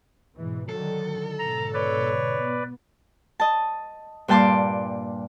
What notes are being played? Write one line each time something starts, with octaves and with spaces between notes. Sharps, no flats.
G#2 B2 E3
D3 D#3 F#3 A4
G#2 B2 D3 A#5
B4 C#5 D5
B3
D#5 A5
G2 A#2 G5 A5 C6 D6